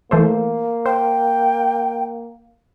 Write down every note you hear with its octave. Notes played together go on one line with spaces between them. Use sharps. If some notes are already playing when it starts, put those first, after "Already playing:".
E3 A3 A#3 C5
C5 G5